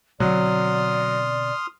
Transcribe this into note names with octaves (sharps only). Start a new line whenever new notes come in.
B2 D3 F#3 C4 D5 C6 D#6 F6